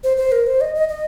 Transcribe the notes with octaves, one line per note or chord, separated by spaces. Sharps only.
C5
C5
A#4
C5
D#5
D#5
D#5